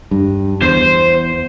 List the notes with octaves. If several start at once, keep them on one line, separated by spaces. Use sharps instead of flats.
G2
E2 C5